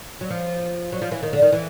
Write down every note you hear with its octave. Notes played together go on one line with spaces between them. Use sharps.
F#3
F3
F#3
F3
E3
D#3
D3
D#3
E3